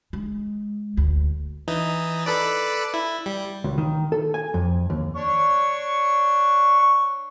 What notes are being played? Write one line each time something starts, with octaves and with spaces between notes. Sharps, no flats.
G#3
D2
E3 D#4
A4 B4 D5
E4
G3
C#2
D#3
A4
G#5
F2
D#2
D4 C#5 C#6